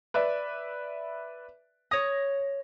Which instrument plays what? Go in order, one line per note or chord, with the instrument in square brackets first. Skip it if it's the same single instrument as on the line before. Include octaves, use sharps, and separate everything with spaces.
[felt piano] B4 D5 E5
[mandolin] C#5 D#6 [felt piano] A#6